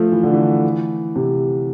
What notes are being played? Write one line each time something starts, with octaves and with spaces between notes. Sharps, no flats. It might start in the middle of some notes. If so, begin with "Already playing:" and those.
Already playing: F3 A3
E3
D3
E3
C3